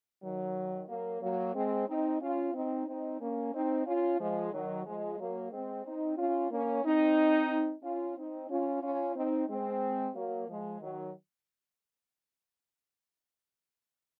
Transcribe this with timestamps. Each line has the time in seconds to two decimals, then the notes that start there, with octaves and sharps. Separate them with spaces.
0.23 D#3 F#3
0.88 F#3 A#3
1.22 F#3 A#3
1.55 G#3 C4
1.88 C4 D#4
2.21 C#4 F4
2.54 C4 D#4
2.88 C4 D#4
3.21 A#3 C#4
3.53 C4 D#4
3.86 C#4 F4
4.20 F3 G#3
4.53 D#3 F#3
4.85 F3 G#3
5.19 F#3 A#3
5.52 G#3 C4
5.85 C4 D#4
6.18 C#4 F4
6.51 A#3 C#4
6.84 C4 D#4
7.84 C#4 F4
8.17 C4 D#4
8.50 C#4 F4
8.82 C#4 F4
9.16 C4 D#4
9.49 G#3 C4
10.15 F#3 A#3
10.48 F3 G#3
10.81 D#3 F#3